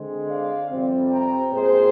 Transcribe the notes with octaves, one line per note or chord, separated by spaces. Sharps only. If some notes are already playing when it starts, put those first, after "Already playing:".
Already playing: D3 G#3 C4
D5 F5
F2 C3 G3 C4
G5 A#5
A#2 G#3 C4 G#4 C5